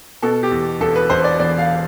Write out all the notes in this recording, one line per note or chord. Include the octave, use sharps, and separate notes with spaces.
B2 A4
G4
E2
E1 A4
B4
E1 C5
D5
E2 D5
F5